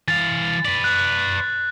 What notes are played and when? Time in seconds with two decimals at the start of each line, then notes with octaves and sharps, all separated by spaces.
0.08 E3 F5 A6
0.65 B4 D5
0.84 F#6